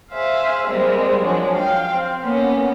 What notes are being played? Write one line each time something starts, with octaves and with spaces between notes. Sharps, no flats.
G#4 C5 E5 F5
G3 G#3 A#3 C4
F3 F#3 G#3 D4
F5 G5
C4
A#3 B3 C#4